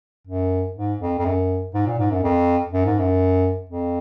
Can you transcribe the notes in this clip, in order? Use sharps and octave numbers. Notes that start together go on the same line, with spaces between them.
F#2
G#2
F2
F2
F#2
G#2
A#2
G#2
F#2
F2
F#2
G#2
F#2
F2